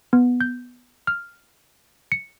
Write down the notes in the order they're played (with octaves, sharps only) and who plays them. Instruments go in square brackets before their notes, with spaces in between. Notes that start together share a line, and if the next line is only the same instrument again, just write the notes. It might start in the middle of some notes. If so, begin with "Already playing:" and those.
[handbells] B3
G6
F6
C#7